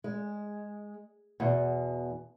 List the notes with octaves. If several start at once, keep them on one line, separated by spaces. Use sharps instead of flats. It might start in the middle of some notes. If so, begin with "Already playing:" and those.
G#3
E2 B2